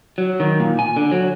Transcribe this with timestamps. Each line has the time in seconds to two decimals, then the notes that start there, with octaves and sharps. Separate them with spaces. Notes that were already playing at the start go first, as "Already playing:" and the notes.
0.18 F#3
0.40 D#3
0.60 A#2
0.79 G#5
0.96 D3
1.12 F#3